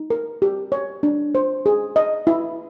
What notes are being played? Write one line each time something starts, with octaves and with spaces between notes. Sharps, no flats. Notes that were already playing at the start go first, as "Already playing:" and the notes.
Already playing: D#4
A#4
G4
C#5
D4
C5
G#4
D#5
E4